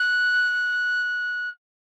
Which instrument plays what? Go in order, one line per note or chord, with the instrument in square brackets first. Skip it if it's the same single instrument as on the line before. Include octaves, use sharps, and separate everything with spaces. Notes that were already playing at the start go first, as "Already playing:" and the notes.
Already playing: [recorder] F#6